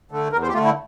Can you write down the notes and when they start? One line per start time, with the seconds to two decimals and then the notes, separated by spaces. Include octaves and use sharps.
0.11 D3 A3
0.32 E2 A#4
0.43 C5
0.49 G4
0.53 A3 F4
0.57 D3
0.65 E4